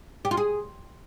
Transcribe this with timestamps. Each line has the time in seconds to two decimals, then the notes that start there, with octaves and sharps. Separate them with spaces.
0.25 G4
0.31 F4
0.37 G#4